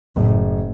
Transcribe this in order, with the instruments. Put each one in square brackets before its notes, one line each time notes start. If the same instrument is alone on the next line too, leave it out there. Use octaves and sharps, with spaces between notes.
[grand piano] F#1 [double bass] A2